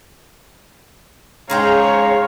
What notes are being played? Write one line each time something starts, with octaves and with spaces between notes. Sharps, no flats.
G#2 C#4 G#4 C5 C#5 F5 G5 A#5